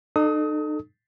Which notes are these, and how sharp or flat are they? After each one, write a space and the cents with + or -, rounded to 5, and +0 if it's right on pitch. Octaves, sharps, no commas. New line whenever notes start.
D#4 -40 A4 +0 D#6 +25